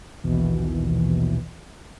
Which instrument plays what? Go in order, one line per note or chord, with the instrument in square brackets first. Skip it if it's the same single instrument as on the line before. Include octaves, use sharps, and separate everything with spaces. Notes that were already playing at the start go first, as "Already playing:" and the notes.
[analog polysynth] A#1 D#2 B2 E3